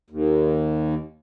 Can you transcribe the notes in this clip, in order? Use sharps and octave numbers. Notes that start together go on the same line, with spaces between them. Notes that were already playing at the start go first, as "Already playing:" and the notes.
D#2